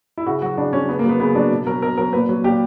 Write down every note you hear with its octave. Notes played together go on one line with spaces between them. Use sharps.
E4
C#3 F#4
F#3 F#4
C#3 D4
F#3 C#4
C#3 B3
A#3
F#3
B3
C#3 B3
F#3 D4
B2
F#3 A#4
B2 A#4
F#3 A#4
A#2 B4
F#3
A#2 G4